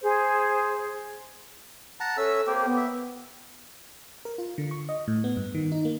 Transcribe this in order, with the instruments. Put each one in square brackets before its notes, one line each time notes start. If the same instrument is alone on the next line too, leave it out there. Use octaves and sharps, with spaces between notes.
[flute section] G#4 C5
[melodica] F#5 A5 A#5
[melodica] C#4 E5 E6 [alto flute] A4
[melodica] A#3 C4 G4
[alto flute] B3
[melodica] E5
[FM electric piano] A#4
F4
D3
C#6
D#5
A2
B3
G2
D#3
D#4
A#3